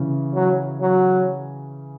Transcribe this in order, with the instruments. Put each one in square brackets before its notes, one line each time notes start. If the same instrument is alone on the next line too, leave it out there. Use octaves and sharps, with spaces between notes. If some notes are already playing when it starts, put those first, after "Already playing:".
Already playing: [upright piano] C#3 E3 C#4
[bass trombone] F#3
F#3